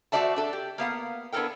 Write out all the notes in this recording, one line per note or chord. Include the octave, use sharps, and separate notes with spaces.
A3 F#4 C5 D5 E5 A5
D4 A4 D5
G4
A#3 B3 F5 F#5
B3 D4 E4 A4 A#4 G5